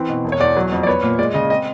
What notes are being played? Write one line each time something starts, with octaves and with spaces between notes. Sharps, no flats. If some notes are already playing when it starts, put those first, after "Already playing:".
Already playing: E3 C4
B2
E1
C#5
E2 D5
F#3
F2
D5
B3 C#5
A#2
G#3 D5
C#3 D#5
C4 D#5